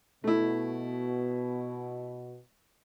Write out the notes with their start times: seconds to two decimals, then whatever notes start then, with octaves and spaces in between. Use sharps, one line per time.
0.24 B2 A3 E4